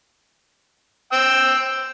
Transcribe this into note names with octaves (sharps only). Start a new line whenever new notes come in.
G5 E6